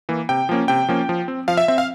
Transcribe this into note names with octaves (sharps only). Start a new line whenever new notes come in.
E3 A#3
C3 G5
F3 A#3 C#4
C3 G5
F3 A#3 C#4
F3
C4
F3 F5
E5
C4 E5
F5